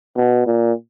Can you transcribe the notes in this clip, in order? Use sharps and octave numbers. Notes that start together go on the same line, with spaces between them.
B2
A#2